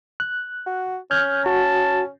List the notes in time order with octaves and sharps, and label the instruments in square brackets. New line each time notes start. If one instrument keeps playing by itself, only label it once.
[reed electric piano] F#6
[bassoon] F#4
[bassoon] C#4 [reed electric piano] F6 G6 G#6
[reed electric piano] F#4 [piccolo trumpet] A5